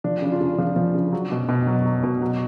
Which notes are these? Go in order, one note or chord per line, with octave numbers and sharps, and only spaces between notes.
F3 D4
C#3 D4
F4
C#3
F3 D4
F3
C#3
F#3
B2
B2
F#3
F#3
B2
F#3